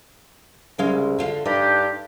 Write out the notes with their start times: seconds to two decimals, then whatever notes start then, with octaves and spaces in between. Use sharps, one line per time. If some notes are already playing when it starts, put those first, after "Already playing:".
0.78 C2 C#3 G#3 F5
1.19 D3 F4 F5
1.46 G2 D4 D#4 G4